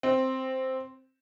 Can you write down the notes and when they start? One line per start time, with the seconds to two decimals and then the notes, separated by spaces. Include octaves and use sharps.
0.03 C4